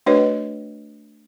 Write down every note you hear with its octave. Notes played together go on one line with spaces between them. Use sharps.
A3 D4 F#4 B4 C#5 D#5